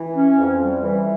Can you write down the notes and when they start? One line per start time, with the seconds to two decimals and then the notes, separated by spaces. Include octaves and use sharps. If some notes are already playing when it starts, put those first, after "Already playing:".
Already playing: E3
0.14 C#4
0.38 F2
0.61 G3
0.83 E3